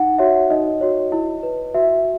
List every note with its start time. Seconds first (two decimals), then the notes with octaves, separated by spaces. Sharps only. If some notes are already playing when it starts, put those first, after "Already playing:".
Already playing: D#4 F#5
0.18 F#4 C#5 E5
0.50 D#4 D#5
0.81 F#4 C#5
1.12 E4
1.43 B4
1.74 F#4 E5